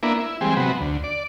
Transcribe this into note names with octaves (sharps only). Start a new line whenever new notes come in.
A#3 B3 D4 E4
E4
E3 G3 G#3 C4
C3 F#3 B3
D2
D5